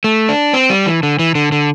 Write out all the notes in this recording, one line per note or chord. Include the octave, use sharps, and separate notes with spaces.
A3
D4
C4
G3
E3
D3
E3
D3
D3